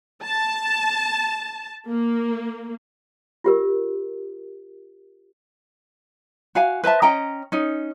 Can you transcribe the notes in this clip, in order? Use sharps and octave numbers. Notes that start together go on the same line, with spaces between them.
A5
A#3
F4 G4 A#4
F#4 F5 G#5
B4 C5 E5 A5
C#4 D#5 G5 A#5
C#4 D#4